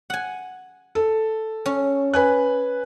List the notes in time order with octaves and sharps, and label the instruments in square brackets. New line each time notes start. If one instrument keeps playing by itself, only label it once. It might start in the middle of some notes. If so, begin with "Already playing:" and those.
[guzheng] F#5 G#5
[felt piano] A4
[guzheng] C#4
[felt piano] B4 G#5 F#6